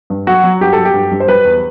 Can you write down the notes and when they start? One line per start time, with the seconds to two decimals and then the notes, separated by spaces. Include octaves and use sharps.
0.10 G2
0.27 F#3 F#4
0.44 F#3
0.61 G2 G4
0.73 F#3 A4
0.85 G4
0.94 G2
1.11 G2
1.20 C5
1.27 G3 B4
1.45 E2